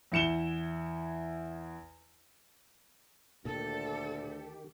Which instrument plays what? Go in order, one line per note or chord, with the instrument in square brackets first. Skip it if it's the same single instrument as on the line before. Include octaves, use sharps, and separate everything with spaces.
[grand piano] E2 E4 C#7 E7 G7
[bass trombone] D2 [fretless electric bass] A#2 [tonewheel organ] D#3 G4 [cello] A4